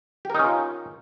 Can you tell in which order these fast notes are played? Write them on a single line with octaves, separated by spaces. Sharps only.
G4 A#4 D#4 C#4 F4